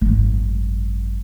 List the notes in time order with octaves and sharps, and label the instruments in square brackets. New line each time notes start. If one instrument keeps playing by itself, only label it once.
[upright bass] G#1 F#2